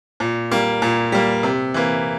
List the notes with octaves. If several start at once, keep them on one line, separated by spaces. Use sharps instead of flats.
A#2
G3 A#3
A#2
G3 A#3
C3
E3 A#3